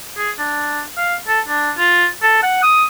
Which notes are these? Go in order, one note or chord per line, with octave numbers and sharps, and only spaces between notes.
G#4
D4
F5
A4
D4
F4
A4
F#5
D#6